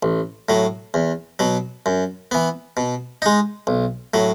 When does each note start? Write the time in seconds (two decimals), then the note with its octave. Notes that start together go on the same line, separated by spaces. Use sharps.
0.03 A1
0.49 A2 F#3
0.94 E2
1.39 B2 F#3
1.86 F#2
2.31 E3 B3
2.77 B2
3.22 G#3 D#4
3.67 B1
4.14 A2 F#3